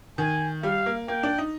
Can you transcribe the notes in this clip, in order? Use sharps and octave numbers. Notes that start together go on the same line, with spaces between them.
D#3 G#5
G3 F5
A#3
A#3 G5
D4
D#4